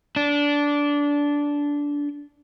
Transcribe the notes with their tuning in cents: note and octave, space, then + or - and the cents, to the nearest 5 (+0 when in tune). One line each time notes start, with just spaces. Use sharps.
D4 -15